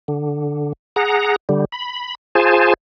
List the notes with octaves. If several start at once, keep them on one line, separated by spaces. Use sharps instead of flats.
D3
G#4 F#5 A#5
D3 G3
B5
F4 G#4 C5 G#5 A5